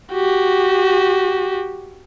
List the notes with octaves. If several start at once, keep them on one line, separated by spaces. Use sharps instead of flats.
F#4 G4